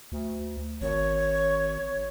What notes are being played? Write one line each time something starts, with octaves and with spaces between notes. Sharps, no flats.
D2
G#1 C#5